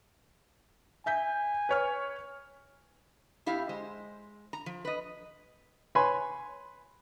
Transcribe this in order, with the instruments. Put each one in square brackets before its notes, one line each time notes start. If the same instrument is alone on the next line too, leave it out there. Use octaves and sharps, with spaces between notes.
[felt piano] E5 G6 B6 [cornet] G#5
[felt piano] B4 C#5 F6
[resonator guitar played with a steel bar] F2 E4 G4 F5
G#3 C5
A#5
F3
B4 D#5
[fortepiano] B4 C#5 G#5 B5 C6